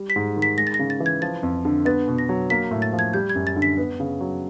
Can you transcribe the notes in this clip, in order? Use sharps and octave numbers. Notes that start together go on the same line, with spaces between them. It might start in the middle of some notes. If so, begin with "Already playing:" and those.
Already playing: G3
B6
G#2
D#3
B6
G#3 A#6
A6
A#6
C#3
A6
E3
G#6
F3 A6
F2
D3
B3 A6
B2
A#6
F#3
A#3 B6
A2
A6
F3
G#6
G3 G6
G#6
F#2
A6
D3
B6
B3
C#3
F#3